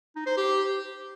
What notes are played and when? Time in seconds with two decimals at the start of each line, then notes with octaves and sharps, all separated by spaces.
0.16 D#4
0.26 C5
0.37 G4